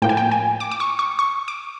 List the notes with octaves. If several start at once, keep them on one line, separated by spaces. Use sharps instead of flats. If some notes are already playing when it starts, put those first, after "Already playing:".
A2 F3 A#3 G5
G#5
G5
G#5
D6
D6
C#6
C#6
C#6
D6